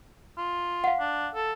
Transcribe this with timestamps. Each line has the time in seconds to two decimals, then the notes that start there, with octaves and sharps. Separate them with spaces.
0.38 F4
0.84 F5 F#5
1.00 D4
1.35 A4